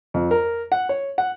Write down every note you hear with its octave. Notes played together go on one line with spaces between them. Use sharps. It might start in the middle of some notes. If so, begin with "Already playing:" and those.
F2
A#4
F#5
C#5
F#5